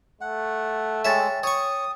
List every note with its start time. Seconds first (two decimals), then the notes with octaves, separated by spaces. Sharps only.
0.21 A3 F#5
1.05 G#3 C#5 E5 G5 A6 E7
1.43 C#5 C#6 D#6